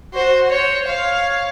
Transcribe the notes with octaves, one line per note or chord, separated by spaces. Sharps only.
F#4 C5
C5 C#5
C#5 F5